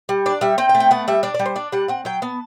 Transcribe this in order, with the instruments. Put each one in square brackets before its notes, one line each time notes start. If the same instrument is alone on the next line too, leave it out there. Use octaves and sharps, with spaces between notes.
[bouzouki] G3
D4 D5
G3 E5
C4 G5
G5
A3
G5
B3 F#5
G3 E5
D4 D5
D5
G3
C5
D4 D5
G3 F#5
C4 F#5
F#3 G5
B3 A5